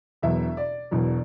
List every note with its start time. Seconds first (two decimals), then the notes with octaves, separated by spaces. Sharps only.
0.22 E1 E2 B2 F#3 E5
0.57 D5
0.91 E1 E2 B2 F#3